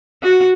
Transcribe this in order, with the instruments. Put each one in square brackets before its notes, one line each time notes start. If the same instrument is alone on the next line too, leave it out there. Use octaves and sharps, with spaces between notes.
[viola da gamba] F#4